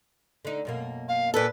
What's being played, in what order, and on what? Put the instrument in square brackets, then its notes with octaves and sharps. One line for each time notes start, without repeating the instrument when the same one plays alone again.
[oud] D3 D#4
F#2 B2 A#3
[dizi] F5
[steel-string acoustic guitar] A#2 A4 [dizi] B4